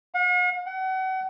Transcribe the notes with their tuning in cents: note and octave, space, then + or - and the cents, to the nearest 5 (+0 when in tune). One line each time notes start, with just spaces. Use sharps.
F#5 -45
F#5 +35